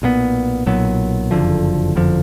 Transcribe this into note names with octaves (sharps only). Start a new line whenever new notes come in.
B1 A#2 F#3 B3
B1 A#2 F#3 B3
F#1 F2 D3 F3
F#1 F2 D3 F3